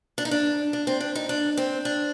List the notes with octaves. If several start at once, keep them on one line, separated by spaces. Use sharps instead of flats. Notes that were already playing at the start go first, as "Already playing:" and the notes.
D4
D#4
D4
D4
C4
D4
D#4
D4
C4
D4